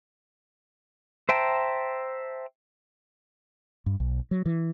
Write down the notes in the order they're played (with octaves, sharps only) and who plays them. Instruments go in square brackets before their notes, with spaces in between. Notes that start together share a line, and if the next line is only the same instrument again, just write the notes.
[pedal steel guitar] C5 E5 G5 A5 A#5
[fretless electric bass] G2
B1
F#3
E3